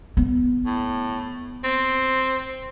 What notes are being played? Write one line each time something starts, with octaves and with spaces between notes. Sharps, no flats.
B3
A2
C4